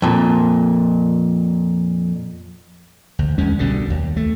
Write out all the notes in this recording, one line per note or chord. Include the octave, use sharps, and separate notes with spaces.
F2 A#2
D2
E2 G#3 C#4
C2 B2 D3 G3
D#2
A3